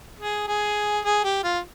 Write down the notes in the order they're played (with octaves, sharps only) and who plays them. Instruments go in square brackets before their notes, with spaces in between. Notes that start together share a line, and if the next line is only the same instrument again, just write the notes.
[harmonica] G#4
G#4
G#4
G4
F4